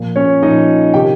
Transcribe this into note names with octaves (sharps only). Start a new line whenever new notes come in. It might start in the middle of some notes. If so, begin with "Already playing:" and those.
Already playing: A#2 F3
C#4 C#5
A#2 F3 D#4 D#5
C3 D#3 G4 G5